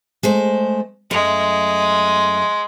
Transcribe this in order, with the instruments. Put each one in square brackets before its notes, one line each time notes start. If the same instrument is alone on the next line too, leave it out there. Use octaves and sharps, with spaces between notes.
[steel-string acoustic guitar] G#3 A3 C5
[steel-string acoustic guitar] F#2 A3 [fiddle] G#3